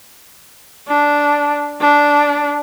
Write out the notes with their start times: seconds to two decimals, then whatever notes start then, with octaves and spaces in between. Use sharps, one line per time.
0.88 D4
1.81 D4